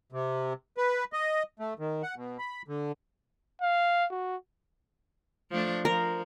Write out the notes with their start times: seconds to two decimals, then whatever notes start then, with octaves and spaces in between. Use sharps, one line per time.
0.12 C3
0.77 B4
1.13 D#5
1.60 A3
1.79 D#3
2.03 F#5
2.16 B2
2.39 B5
2.68 D3
3.62 F5
4.11 F#4
5.51 F3 A3 D4
5.85 F3 A#4